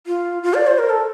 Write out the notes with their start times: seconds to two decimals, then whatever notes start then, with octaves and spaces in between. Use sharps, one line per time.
0.07 F4
0.43 F4
0.54 D5
0.67 C5
0.79 A#4
0.90 A4